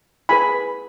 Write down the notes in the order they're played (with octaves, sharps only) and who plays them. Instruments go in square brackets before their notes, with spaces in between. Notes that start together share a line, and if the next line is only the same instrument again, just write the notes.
[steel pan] E4 G#4 B4 G#5 B5